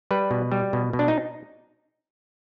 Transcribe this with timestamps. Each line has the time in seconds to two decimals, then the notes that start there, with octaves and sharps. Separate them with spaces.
0.11 G3 B4
0.31 B2
0.52 G3
0.73 B2
0.93 B2
0.99 D4
1.08 D#4